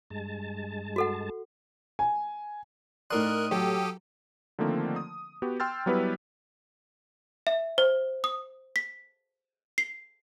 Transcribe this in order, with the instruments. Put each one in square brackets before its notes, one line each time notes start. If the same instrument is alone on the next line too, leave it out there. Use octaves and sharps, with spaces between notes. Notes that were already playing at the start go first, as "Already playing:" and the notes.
[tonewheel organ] G2 G#3 A5
[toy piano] F#4 A4 F#5
[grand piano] G#5
[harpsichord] A2 C6 [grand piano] D#4 D5 [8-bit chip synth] A#4 F#6 [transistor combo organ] D#6
[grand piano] F#3 [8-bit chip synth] G4 A4 G5
[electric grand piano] D3 D#3 F3 A3 A#3 C4
D#6
B3 F#4 G4
G5 C6 E6 F6 G6 A6
F#3 G3 B3 E4 G4 B4
[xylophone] E5
C5
D#6
B6
C7